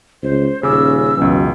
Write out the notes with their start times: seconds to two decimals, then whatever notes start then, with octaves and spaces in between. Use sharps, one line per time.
0.23 C#2 C5
0.63 D#1 C#3 C#4 D6 E6
1.17 C#2 F#2 B2 E3